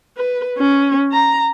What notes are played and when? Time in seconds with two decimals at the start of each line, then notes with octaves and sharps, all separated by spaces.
0.17 B4
0.58 C#4
1.12 A#5